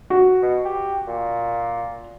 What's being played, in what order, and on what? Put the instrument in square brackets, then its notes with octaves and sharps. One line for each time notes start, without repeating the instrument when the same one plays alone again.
[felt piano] F#4
[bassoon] B2
G4
A#2